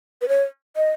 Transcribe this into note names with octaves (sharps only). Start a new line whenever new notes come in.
B4
C#5
D#5